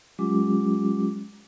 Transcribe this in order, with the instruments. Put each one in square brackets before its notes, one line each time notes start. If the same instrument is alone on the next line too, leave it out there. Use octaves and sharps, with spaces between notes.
[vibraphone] F#3 G#3 C#4 F4 G4 D6